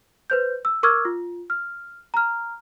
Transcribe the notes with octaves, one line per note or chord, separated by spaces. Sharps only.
B4 C5 G6
E6
A#4 C#6 D6 E6 F6 G#6
F4
F6
A#5 F6